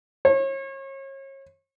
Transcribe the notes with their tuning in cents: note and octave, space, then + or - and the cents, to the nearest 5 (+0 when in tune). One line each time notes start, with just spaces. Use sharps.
C#5 -35